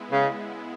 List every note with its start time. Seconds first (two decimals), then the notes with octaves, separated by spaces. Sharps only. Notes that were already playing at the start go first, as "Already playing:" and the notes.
Already playing: G#3 B3 E4
0.12 C#3